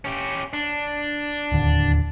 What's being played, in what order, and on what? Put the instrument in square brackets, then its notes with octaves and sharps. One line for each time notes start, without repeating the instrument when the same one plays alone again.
[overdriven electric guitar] C#4 G4
D4
[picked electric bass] D1 D#2 D3